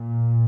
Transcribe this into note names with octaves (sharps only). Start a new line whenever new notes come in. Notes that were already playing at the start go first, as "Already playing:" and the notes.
Already playing: A#2